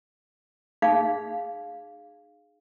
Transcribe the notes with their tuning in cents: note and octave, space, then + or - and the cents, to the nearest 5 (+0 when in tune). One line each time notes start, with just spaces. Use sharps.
D#4 -35 G#4 +0 F5 +0